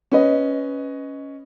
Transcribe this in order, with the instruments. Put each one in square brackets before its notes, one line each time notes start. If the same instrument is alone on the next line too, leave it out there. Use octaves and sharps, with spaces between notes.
[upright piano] C#4 B4 D#5